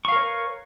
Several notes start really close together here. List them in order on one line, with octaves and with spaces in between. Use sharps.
C#6 F5 A#4 C#5 B4